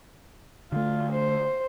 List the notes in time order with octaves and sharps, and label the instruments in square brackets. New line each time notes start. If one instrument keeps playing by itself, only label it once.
[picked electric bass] D3 A3 [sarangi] F4
[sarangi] C5